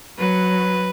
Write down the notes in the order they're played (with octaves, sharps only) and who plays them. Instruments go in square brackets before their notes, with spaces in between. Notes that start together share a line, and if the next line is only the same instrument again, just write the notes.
[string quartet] F#3 [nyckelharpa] B4